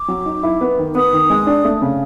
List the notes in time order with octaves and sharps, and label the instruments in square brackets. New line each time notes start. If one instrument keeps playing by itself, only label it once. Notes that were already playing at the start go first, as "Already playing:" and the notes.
Already playing: [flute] D6
[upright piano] F#3
D#4
E4
B3
D#3
[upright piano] B3 [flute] D#6
[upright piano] D#3
G#3
D4
A3
C#3